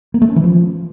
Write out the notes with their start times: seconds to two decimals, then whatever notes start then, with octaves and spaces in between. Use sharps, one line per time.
0.14 A#3
0.22 A3
0.29 C#4
0.36 E3
0.44 F3